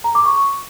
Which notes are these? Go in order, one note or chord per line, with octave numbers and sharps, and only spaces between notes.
A#5
D6
C#6